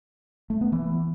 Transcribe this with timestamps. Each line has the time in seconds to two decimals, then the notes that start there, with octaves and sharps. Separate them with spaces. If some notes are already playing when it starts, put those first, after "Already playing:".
0.50 A3
0.61 B3
0.72 E3